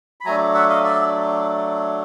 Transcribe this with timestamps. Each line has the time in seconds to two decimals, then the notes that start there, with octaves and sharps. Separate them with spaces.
0.21 B5
0.25 F#3 A3 D4 G#5 A#5
0.54 E5 F#5
0.69 D#5 F5
0.84 D5 E5